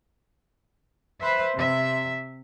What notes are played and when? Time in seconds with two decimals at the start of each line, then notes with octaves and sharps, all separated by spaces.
1.20 B4 C5 E5
1.56 C3 E5